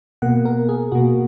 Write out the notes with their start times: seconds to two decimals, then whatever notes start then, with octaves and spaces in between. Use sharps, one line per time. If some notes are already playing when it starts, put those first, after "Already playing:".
0.22 B2 A#3 F#5
0.45 A#4
0.69 G#4
0.92 B2 A#3 F#4